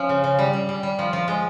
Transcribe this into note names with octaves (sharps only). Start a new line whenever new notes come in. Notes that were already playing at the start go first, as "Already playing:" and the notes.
Already playing: F3 C#4
C#3
C#3
G3
G3
G3
G3
F3
F3
G#3